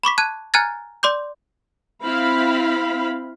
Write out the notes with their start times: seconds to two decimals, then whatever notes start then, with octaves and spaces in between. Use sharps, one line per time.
0.03 B5 C#6 D6 B6
0.18 A5 F#6 G#6 D#7
0.54 G#5 A#5 F6 F#6 G#6 A6
1.03 D5 C6 D6 G6
2.03 C4 E4 F5 B5